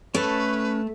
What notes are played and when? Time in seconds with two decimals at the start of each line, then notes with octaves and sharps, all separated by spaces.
0.15 A3 C#4 B4 C#5 A5